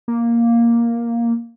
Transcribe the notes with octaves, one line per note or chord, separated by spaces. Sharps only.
A#3